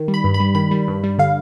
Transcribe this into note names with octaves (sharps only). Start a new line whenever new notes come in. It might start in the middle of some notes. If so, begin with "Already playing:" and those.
Already playing: D#3
G3
B5
G2
B5
G3
D#3 B5
G3
G2
G3
D3 F5